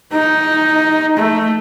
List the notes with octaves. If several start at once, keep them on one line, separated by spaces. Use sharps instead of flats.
D#4
A3